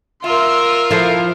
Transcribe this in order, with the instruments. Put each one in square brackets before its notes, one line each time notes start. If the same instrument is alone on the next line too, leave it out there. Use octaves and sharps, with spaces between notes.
[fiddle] F4 A#4 [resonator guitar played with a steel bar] E5 [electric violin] C6 E6
[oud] F3 [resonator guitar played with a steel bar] E4 A4 C5 [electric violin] F5